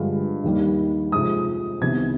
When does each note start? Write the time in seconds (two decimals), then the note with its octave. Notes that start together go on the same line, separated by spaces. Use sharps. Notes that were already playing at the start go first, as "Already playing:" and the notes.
Already playing: G2 D3 F3 G#3
0.44 D#2 D#3 G3
1.12 F2 C3 F3 G#3 D#6
1.81 C2 C3 D#3 B3 G#6